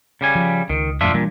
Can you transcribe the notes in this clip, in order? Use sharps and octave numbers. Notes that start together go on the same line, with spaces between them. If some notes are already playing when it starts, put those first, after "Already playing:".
C#3 G3 G#5
F3
C#2 D#3
F2 A2 D4 F4 E5
A#2 E3 G3 D4